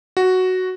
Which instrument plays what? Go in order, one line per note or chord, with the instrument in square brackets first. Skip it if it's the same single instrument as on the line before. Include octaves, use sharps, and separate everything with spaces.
[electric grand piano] F#4